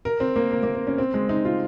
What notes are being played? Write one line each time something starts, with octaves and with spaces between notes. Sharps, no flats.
A#4
C4
A#3
A#3
A#3
C4
C#4
C4
G#3
D#4
F4